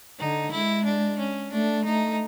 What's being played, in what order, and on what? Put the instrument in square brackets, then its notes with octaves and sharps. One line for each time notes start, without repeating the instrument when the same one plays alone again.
[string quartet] D3 [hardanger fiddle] D#4
[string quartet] G#3 [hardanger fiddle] E4
[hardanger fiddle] D4
C#4
[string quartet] A3 [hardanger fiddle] D4
[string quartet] A3 [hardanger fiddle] D#4